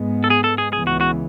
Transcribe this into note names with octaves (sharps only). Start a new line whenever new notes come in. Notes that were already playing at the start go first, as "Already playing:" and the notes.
Already playing: G#2 G#3 B3
A4
G#4
A4
G#4
C#2 C#3 E3 B3 G#4
F#4
F#4